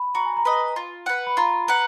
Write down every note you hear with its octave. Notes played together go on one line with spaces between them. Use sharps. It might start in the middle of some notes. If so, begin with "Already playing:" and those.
Already playing: B5
F#4 A#5
G#5
A#5
B4 D#5
F4
B4 F#5
B5
F4 A#5
B4 F#5 A#5